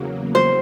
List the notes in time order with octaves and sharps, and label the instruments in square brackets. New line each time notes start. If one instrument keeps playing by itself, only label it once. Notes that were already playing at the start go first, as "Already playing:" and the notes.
Already playing: [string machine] E2 C#3 F#3 A#3
[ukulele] C5